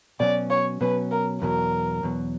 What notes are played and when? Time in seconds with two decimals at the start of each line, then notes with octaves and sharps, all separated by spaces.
0.20 B2 F#3 C#4 D5
0.50 C#5
0.81 B2 F#3 C#4 B4
1.11 A#4
1.42 E2 B2 F#3 A#4
2.03 E2 B2 F#3